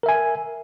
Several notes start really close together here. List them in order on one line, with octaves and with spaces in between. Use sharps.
A#4 E5 G#5